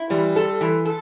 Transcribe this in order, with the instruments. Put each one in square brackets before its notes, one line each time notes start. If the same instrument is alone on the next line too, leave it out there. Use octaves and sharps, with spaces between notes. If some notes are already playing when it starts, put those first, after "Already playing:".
Already playing: [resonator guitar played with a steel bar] E4
[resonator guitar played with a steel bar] E3 [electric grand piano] G3
[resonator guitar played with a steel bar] A4
E3
A4